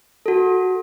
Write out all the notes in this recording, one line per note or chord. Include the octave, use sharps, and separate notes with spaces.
F#4 A4